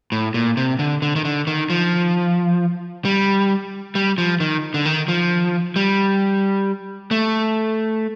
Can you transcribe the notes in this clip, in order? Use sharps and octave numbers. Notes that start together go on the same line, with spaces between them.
A2
A#2
C3
D3
D3
D#3
D3
D#3
F3
G3
G3
F3
D#3
D3
D#3
F3
G3
A3